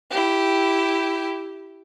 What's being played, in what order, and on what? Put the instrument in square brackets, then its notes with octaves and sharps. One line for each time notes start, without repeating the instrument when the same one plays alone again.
[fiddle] E4 G4